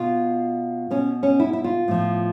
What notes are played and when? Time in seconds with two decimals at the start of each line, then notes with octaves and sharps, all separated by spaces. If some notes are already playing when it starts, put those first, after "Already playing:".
Already playing: B2 F4
0.91 B2 C#4
1.23 C#4
1.40 E4
1.53 E4
1.64 F4
1.88 A2 F3